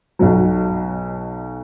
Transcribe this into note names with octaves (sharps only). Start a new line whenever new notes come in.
B1 B2 F#3